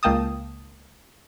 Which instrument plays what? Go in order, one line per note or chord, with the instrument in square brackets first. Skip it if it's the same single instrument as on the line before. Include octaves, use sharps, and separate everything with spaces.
[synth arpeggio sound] C#2 A#3 G5 A5 D#6